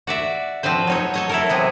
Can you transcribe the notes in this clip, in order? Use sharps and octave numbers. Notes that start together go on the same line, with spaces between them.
F#4 D5 E5
F3 C4 F#4 B4 C5
F#3 D#4 C#5
A4 C#5 D#5
E4 A4 A#4
C3 F#3 B3 G#4